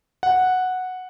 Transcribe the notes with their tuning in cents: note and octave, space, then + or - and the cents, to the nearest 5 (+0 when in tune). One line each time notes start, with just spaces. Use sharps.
F#5 -5